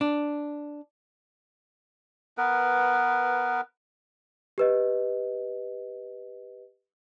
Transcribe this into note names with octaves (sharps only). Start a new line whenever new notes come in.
D4
B3 A#4 B4
G4 B4 D#5